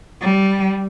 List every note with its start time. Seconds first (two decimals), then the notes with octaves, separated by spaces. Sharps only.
0.21 G3